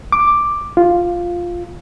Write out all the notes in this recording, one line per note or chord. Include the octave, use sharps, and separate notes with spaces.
D6
F4